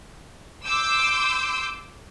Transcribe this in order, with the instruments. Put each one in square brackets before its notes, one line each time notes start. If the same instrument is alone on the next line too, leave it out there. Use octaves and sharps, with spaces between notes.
[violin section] C6 D6 E6 G6